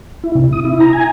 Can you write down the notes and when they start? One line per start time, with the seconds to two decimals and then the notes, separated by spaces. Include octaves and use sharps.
0.24 E4
0.35 C3
0.52 D#6
0.65 E4
0.80 A#5
0.93 G#5